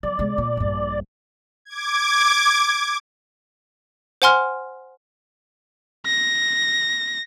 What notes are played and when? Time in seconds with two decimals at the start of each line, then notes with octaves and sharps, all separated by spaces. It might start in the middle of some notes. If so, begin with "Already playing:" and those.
0.03 F#3 D5
0.19 C3 G#3
0.38 A#2
0.57 A#1 G2
1.65 D6 G#6
4.22 C5 F#5 G#5 C6 F6
6.06 A#6